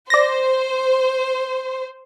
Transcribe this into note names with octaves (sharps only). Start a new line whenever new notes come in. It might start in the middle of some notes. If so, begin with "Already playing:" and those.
C5 D5 A#6